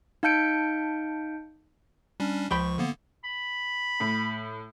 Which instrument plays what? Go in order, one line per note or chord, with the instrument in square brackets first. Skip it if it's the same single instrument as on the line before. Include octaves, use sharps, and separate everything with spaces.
[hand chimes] D#4 F5 A5 G6 C#7 D7
[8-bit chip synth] G3 C#4 D4
[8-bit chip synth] C#2 C#6 [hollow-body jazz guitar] F3 G5 B5
[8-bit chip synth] D3 A#3 B3
[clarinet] B5
[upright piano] A2